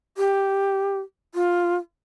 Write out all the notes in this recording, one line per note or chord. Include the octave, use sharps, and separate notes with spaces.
G4
F4